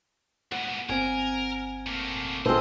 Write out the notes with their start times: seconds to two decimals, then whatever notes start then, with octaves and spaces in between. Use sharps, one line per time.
0.52 G#2 B2 F#5
0.89 G1 C4 A#4 G#5
1.87 A2 A#3
2.46 A1 C4 F4 G#4 A4 C5 D#5